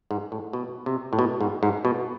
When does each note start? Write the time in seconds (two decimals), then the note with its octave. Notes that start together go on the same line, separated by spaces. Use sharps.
0.11 G#2
0.32 A2
0.53 B2
0.86 C3
1.13 A2
1.19 B2
1.41 G#2
1.63 G#2
1.85 B2